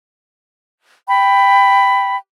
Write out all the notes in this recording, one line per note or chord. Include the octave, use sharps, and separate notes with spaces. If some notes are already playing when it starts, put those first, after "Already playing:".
G5 B5